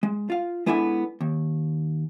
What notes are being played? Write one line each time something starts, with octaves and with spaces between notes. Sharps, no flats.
G#3
F4 F5
G#3 B3 D4 E4 A4 G#5
D#2